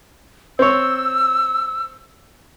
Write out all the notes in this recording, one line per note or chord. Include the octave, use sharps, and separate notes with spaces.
C4 C#5 E6